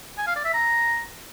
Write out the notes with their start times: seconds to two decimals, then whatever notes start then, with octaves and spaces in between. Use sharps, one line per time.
0.18 G#5
0.27 F5
0.36 D5
0.45 E5
0.54 A#5